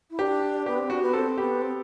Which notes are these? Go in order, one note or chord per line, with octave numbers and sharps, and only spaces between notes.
E4
D4 G4
B3 G4
C4
D4 F#4
B3
C4 A4
B3 G4
C4